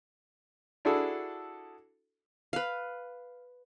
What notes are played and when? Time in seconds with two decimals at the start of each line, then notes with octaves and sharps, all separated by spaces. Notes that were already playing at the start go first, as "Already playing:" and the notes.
0.85 D4 E4 F#4 G#4 A4
2.53 B4 F5